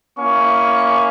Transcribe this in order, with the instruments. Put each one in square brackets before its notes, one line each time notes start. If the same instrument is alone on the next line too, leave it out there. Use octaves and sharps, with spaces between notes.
[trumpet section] A#3 C#4 E4 C#6